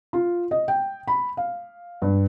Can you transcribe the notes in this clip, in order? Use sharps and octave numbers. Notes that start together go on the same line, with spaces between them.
F4
D#5
G5
B5
F5
G2